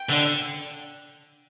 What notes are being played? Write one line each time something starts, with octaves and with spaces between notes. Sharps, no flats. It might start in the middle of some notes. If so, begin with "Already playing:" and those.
Already playing: G5
D3